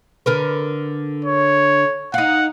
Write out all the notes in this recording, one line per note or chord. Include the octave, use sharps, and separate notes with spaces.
D3 A#4 B4
C#5
D#4 F5 F#5